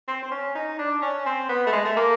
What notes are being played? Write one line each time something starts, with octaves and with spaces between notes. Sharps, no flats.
C4
C4
C#4
D#4
D4
C#4
C4
B3
A3
G#3
A3
A#3